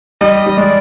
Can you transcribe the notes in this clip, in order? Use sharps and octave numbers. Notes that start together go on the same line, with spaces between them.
G3 D#5
G3
G#3 D5